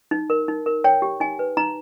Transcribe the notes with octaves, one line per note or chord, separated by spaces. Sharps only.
D#4
A#4
D#4
A#4
C#5 G5
G4
D#4 G#5
B4
D#4 A#5